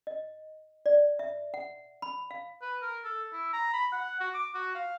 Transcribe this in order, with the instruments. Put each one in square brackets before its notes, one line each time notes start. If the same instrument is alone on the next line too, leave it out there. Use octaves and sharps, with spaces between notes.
[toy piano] D#5
D5
E5
F#5
B5
F5
[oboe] B4
A#4
A4
E4
A#5
B5
F#5
F#4
D6
F#4
F5